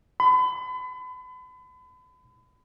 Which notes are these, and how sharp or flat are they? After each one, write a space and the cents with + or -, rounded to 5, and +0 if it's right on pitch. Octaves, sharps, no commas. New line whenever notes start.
B5 +35